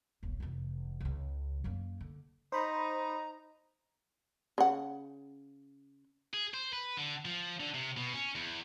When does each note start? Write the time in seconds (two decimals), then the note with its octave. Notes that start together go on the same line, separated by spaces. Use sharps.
0.23 E1 B1
0.40 F1 E3
1.00 C#2 C#3
1.64 F#2 A#3
2.00 D3
2.52 D#4 C5 A#5 B5
4.58 C#3 F#5
6.33 G#4
6.54 C5
6.73 B4
6.97 D3
7.25 F3
7.60 D3
7.74 C3
7.97 B2
8.13 C#4
8.35 E2